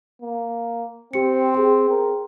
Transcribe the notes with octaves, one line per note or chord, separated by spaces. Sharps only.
A#3
C4 G4 C#7
G#4 G5 C6
A#4